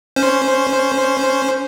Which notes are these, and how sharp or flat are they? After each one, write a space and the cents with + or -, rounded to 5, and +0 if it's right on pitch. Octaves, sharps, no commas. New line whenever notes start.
C#4 +0 C5 +0